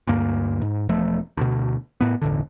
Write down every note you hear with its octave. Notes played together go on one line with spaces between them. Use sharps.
D2 G2 A#3
G#2
E1 F3 A3
D2 B2
A2 B3
E1 A1 D3